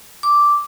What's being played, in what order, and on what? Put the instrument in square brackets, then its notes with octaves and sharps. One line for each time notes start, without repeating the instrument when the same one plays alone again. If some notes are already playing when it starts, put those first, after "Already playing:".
[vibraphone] D6